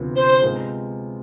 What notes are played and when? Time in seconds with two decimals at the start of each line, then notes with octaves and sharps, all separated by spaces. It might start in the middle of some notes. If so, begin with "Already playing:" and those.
Already playing: D2 C3 F3 B3
0.16 C5
0.42 C3 G#3 B3 F4 G#4